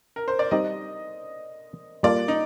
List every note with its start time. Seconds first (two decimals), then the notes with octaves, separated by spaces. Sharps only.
0.16 A#4
0.28 C5
0.39 D5
0.51 G3 C4 D#4 G4 D#5
2.03 G3 A#3 F4 A4 D5
2.28 D#4